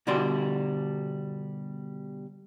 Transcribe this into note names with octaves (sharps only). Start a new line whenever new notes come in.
B2 D3 G3 F#4 D5 C6